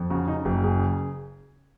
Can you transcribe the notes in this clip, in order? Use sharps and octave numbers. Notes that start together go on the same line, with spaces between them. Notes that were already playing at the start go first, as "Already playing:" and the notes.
Already playing: F2
C#3 F#4
C#3 D#4
F#1
C#3 G#4